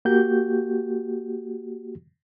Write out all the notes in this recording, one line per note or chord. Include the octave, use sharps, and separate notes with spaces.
A#3 F#4 G4 G6